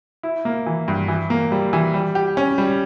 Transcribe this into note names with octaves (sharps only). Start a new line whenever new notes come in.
E4
A#3
E3
G2
E3
A#3
G3
E3
G3
G4
C#4
G3